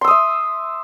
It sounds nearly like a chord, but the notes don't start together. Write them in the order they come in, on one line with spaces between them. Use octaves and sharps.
C6 E6 D#6 E5